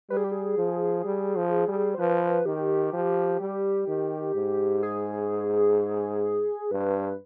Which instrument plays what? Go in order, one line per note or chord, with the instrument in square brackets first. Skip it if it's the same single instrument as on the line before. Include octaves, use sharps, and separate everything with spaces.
[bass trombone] G3 [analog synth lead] B4
[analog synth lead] G#4
G4
G#4
[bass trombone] F3
G3
F3
G3
[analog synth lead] C5
[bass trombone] F3 [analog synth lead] B4
[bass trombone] D#3 [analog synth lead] G4
[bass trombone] F3
G3
D#3
G#2
[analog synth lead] G#4
[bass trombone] G2 [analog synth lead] B4